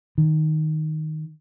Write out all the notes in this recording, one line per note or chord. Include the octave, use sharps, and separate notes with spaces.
D#3